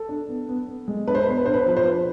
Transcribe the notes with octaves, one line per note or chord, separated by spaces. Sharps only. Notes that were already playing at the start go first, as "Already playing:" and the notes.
Already playing: A4
D4
B3
B3
B3
G#3
D4 B4
C5
B4
B3 C5
B4
D4 C5
B4
C5
F3 B4
C5
D4 B4